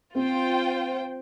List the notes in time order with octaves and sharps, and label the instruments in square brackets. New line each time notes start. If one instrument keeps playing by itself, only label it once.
[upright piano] C4 [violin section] F4 C5 G5